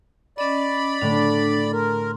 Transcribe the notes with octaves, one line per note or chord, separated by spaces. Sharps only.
C#4 D5 D#5 B5
A2 D3 A3 D4
A#4 C6